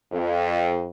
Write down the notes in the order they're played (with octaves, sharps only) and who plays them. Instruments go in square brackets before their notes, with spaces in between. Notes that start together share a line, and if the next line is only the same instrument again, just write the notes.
[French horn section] F2